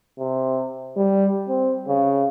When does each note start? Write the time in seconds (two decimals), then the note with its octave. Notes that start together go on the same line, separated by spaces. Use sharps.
0.19 C3
0.96 G3
1.48 C4
1.88 C#3